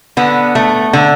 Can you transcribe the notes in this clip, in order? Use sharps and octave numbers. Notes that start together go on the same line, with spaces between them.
D3 B3
A3
D3